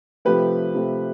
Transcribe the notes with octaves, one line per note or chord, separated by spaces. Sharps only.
C3 F3 A3 G4 B4
C3 F3 A3